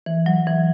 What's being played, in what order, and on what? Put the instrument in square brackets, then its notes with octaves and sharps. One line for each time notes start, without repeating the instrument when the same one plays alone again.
[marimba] E3
F#3
E3